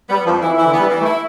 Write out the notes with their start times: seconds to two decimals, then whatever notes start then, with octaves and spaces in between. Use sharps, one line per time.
0.10 G3 B3
0.25 F2 F3
0.42 E3 E4
0.57 E3 E4
0.65 D3
0.72 E3 B3
0.79 G3
0.90 E3
1.00 A3
1.05 E4